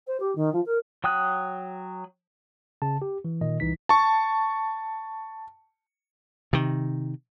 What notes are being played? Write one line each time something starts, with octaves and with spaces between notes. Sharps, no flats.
C5
G4
D#3
F3
A#4
F#3 G5 D#6 F#6
C#3 A5
G4
E3
A#2 D#3 D#5
C2 E3 D#4 B6
A5 C#6
C3 D#3